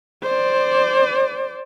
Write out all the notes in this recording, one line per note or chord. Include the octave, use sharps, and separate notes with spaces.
C5 D5